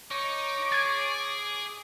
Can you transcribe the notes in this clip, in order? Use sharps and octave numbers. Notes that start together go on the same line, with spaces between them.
D#4 C#5 D6
G#4 G#6 A6